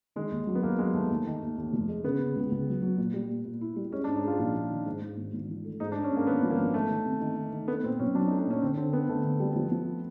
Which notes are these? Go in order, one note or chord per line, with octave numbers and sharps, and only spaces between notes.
D#3 G#3
D#2
F#3
B3
D#2 A#3
F#3 G#3
D#2 A3
D#2
D#3
D#2
D#2
F1
G#3
C#3 B3
C#3
C#2
C#2
F#3
F#3
A#2
G3
A#2
A#2
E4
G3
G#3 C#4
D4
G#2
D#4
G#3 F4
A#1 F4
A#1
D#3
G#2
G#2
G#1
G#1
E3
A3
G#2 D#4
D4
G#2
C#4
G#2
A#3
G#1 B3
F3
A#3
G#1
D#3 A3
D#3
C3
D#3
D#3
D#3
A3 B3
A#2 C4
B1 C#4
F#3 D4
D#4
A3
D4
A#2 C#4
D3 C4
D3 C4
B3 C4
D3 A3
D3
G3
F3
F3